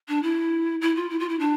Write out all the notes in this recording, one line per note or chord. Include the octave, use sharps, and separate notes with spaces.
D4
E4
E4
F4
E4
F4
E4
D4